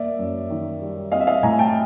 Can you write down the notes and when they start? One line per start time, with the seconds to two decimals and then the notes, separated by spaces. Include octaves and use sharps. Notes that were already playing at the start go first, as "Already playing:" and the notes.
Already playing: A#3 D5 E5
0.19 F#2
0.50 D#3
0.81 G3
1.12 C4 D#5 F5
1.21 E5
1.27 D#5 F5
1.43 A2 G#5 A#5
1.58 G5 A5